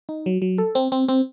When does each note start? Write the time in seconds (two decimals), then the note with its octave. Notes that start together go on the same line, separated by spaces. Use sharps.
0.09 D#4
0.26 F#3
0.42 F#3
0.58 A4
0.75 C4
0.92 C4
1.08 C4